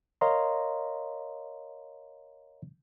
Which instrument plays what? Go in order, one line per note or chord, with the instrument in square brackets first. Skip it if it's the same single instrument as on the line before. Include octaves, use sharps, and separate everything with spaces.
[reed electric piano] A#4 C#5 D#5 F5 A#5 C6